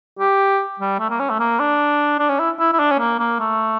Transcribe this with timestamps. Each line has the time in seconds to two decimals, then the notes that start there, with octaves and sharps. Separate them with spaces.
0.19 G4
0.79 G3
0.99 A3
1.10 A#3
1.20 C#4
1.30 A3
1.39 A#3
1.59 D4
2.19 D4
2.29 C#4
2.39 E4
2.59 E4
2.73 E4
2.79 D4
2.91 C#4
2.99 A#3
3.19 A#3
3.39 A3